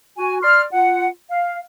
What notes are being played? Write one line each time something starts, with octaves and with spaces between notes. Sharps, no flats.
F#4 G#5
D5 C6 F6
F4 F#5
F5